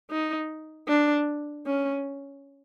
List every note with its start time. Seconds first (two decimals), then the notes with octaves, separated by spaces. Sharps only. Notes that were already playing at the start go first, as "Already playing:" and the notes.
0.10 D#4
0.88 D4
1.66 C#4